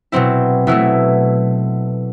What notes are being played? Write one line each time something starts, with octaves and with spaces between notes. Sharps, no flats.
B2 F#3 C4 E4
B2 F#3 A3 E4